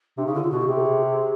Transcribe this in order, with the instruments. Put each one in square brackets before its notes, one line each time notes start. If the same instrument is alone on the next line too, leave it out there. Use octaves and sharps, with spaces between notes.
[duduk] C3 [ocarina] D4
[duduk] C#3 [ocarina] D#4
[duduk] D3 [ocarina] E4
[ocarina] F4
[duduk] B2 [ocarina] F#4
[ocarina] G4
[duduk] C3 [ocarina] G#4
[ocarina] A4
G#4